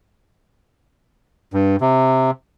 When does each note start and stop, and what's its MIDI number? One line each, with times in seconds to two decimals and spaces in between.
1.53 1.76 43
1.81 2.31 48